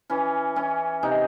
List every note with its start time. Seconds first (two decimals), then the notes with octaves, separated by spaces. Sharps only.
0.10 E3 C#4
0.56 E3 C#4
1.03 C3 D#4